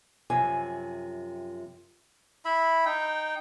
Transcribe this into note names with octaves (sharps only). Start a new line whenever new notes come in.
F#2 C3 F3 G#5
E4 E5 B5
D#4 G5